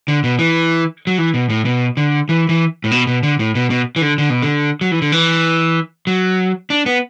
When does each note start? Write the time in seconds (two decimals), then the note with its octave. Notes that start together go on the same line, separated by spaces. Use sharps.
0.08 D3
0.24 B2
0.39 E3
1.07 F#3
1.18 E3
1.34 B2
1.50 A2
1.65 B2
1.97 D3
2.29 E3
2.49 E3
2.84 A2
2.91 B2
3.07 B2
3.23 D3
3.39 A2
3.55 B2
3.70 B2
3.96 E3
4.02 D3
4.18 D3
4.30 B2
4.43 D3
4.81 F#3
4.91 E3
5.02 D3
5.12 E3
6.07 F#3
6.70 D4
6.86 B3